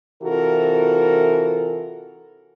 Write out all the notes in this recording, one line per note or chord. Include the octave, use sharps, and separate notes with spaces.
C3 E3 F4 F#4 A4 A#4